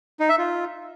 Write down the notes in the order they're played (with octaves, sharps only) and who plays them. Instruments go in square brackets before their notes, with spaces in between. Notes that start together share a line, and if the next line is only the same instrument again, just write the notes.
[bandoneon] D#4
E5
F4